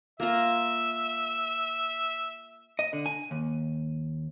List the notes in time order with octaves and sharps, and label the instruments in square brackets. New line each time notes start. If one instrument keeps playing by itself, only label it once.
[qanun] A#3 F4 A#5 [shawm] E5
[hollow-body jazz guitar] D#5
D3
G#5
D#2